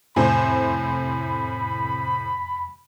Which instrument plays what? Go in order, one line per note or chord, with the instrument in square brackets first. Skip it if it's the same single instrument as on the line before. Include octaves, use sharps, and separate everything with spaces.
[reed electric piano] F2 G#5 [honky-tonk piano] A2 C3 C5 [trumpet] B5